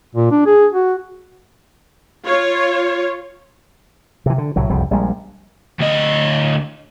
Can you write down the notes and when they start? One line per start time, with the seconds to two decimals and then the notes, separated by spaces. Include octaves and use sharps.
0.15 A#2
0.31 D4
0.46 G#4
0.72 F#4
2.26 F4 C#5
4.26 C3 E3
4.38 D3
4.56 C2 A2 F#3
4.69 F#1 C2 F2 G3
4.91 A#1 G3 G#3
5.79 D2 D#5